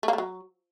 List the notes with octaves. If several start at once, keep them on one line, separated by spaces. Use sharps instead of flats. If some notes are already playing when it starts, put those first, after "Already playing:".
A3
A#3
A3
F#3